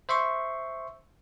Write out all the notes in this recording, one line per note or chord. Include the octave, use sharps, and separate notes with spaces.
C5 E5 C6 C#6